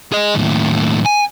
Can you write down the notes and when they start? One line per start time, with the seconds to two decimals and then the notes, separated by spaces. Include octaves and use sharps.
0.12 G#4 D#5
0.34 D#2 A2
1.05 G#5